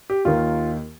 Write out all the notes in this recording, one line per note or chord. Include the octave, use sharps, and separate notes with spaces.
G4
D#2 D#3 F4